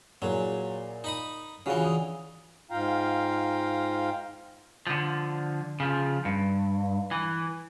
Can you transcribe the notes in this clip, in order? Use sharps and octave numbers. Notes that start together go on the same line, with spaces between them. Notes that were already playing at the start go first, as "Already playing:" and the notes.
A#2 F#3 E4 G#4
D#4 B5 D#6
C#3 E3 D4 F4 F#4
D#6
G#2 F4 F5 G5 A#5
D3 F3
C#3 F3
G2
E3